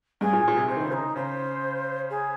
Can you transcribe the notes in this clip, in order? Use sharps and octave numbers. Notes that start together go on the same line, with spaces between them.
G2 G#4
A#2
A#2
C3
C3 C5
D#3
C#3
D#4
C#3 C5
G#4